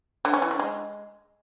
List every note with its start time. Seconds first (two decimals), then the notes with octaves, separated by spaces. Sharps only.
0.25 D3
0.33 C#4
0.42 E3
0.51 D3
0.59 G#3